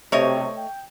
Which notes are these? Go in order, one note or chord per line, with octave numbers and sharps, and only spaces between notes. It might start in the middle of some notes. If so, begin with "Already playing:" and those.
B1 C3 A3 C#5 D#5
G5